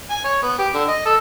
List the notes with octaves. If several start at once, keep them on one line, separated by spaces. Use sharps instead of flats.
G#5
C#5
B3
G4
D3
D#5
A4